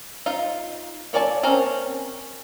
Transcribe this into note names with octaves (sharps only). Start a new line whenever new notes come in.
D#4 F4 F5
A#3 C#5 D5 G#5 A5
C4 C#4 A#4